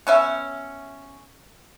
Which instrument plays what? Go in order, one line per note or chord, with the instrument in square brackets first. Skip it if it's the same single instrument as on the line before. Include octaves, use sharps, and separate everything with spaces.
[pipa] B3 C#4 E5